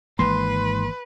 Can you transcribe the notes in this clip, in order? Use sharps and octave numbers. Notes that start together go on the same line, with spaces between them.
G#1 G#2 E3 A#3 B4 C6